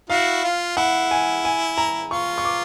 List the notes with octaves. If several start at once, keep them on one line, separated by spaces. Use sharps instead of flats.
E4 F#4 F5
F4
E4 F#5
G#5
G#5
A#5
F4 C#6
C#6
D6